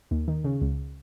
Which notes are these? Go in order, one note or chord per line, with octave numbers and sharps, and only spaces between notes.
D#2
D#3
C#3
C#2